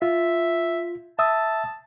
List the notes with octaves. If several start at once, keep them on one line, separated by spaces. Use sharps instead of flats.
F4 E5
E5 A5 D#6 E6